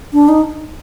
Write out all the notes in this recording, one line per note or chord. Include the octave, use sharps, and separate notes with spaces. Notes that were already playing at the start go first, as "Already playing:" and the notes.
D4
D#4